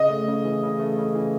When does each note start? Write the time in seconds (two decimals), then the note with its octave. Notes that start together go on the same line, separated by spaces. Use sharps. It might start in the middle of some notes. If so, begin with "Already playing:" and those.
Already playing: C#3 D#5
0.10 A3
0.28 C#3
0.45 E3
0.63 C#3
0.80 A3
0.98 C#3
1.15 E3